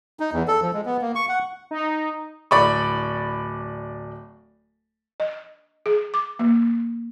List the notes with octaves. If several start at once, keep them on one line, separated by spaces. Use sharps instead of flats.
D#4
E2
A4
F3
G#3
B3
A#3
C#6
F#5
D#4
D1 D5 B5 C#6
D#5
G#4
D6
A#3